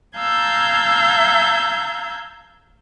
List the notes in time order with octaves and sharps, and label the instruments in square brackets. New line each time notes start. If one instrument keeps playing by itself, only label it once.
[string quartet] F5 A5 A#5 E6 G6 G#6